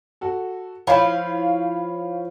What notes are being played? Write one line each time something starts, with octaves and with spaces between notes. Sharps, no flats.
F#4 A4
F3 E4 C#5 F5 B5